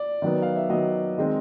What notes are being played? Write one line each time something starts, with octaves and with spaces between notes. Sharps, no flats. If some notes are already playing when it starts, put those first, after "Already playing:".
Already playing: D5
D#3 F#3 B3
F5
E5
D#3 F#3 B3 D#5
D#3 G#3 C4